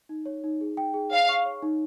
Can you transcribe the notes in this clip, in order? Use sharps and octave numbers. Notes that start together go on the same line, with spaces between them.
D#4
C#5
D#4
G#4
G5
G#4
C#5 F5
C#6
C#5
D#4